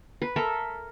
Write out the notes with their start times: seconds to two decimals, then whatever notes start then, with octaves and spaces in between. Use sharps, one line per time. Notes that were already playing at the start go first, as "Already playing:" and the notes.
0.22 B4
0.36 A4 A#4 E5